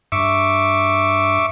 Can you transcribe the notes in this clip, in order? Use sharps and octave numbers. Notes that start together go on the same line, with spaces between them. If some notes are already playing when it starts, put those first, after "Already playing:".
G2 E5 C#6 D6